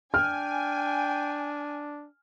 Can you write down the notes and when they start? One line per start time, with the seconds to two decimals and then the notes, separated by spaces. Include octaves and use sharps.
0.14 D4 G5 G#5 F6